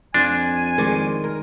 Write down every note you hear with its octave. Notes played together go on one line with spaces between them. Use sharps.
F2 D4 F4 G#5
D#3 G#3 D5
A#4